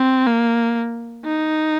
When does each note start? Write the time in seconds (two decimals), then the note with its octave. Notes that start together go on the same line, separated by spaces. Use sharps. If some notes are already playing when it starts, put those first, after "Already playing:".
Already playing: C4
0.27 A#3
1.24 D#4